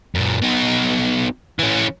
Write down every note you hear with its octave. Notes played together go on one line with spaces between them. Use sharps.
F#2 A#2
B2 D#4
E3 C#4